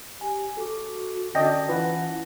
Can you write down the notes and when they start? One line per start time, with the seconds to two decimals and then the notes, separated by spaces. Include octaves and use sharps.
0.21 G4 G#5
0.57 F#4 A4 D6
1.35 D3 C#4 D5 D#5 G5 A5 A#6
1.69 E3 F4 B4 F#5